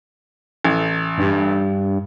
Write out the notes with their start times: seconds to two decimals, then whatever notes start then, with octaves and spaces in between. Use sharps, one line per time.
0.65 A1
1.18 G2